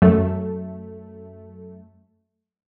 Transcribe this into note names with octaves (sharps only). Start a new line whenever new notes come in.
F#2 A3